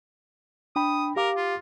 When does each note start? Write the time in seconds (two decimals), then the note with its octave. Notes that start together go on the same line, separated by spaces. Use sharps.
0.76 D4 G5 B5 D#6
1.16 G4 A#4 F5 D6
1.37 F4